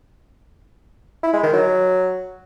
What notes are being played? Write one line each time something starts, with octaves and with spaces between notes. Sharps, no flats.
E4
G#3
D#3
F#3